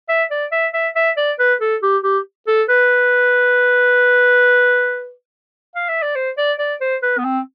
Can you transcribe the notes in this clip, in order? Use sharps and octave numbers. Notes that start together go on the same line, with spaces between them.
E5
D5
E5
E5
E5
D5
B4
A4
G4
G4
A4
B4
F5
E5
D5
C5
D5
D5
C5
B4
B3
C4